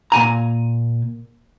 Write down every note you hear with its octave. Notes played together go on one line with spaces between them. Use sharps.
A#2 G#5 A#5